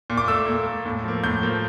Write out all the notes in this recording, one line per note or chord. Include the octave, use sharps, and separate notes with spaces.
A#2
D6
A3 E6
A#2
A3
A2
F3 A#3
A2 G6
F3 A#3